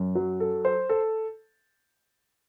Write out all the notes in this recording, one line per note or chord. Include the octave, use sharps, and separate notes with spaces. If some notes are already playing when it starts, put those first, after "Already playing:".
Already playing: F#2
F#3
A4
C5
A4